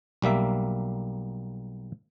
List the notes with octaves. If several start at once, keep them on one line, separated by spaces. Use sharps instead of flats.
B1 G3 A#3 E5